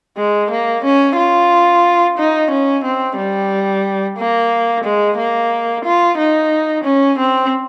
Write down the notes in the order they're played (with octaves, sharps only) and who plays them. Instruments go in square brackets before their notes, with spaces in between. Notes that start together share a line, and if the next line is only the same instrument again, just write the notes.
[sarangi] G#3
A#3
C#4
F4
D#4
C#4
C4
G3
A#3
G#3
A#3
F4
D#4
C#4
C4